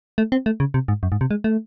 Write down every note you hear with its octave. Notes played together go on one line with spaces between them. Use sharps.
A3
C4
A3
C#3
C3
G#2
F#2
G#2
C3
G#3
A3